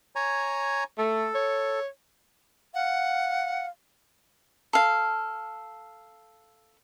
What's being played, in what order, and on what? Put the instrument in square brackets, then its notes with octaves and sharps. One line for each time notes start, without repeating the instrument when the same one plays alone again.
[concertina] C#5 G#5 A#5
[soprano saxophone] A3 [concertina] A4
[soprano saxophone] C#5
[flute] F5 [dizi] F#5
[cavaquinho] A4 F5